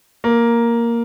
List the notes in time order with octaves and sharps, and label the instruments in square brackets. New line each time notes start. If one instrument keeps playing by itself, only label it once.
[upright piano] A#3